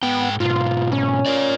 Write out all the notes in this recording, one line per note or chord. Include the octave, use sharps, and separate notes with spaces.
G#2 B3 G5
G#2 B2 F4
C#4
F4 A#4 D5